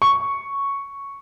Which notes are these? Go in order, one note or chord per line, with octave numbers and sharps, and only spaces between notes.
C#6